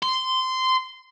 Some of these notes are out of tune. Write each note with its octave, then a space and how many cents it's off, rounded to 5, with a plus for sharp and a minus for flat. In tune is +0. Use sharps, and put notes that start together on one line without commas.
C6 -15